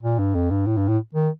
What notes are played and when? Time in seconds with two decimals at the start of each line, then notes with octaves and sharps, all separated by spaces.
0.03 A#2
0.19 G2
0.35 F2
0.51 G2
0.67 A2
0.77 G2
0.88 A2
1.15 D#3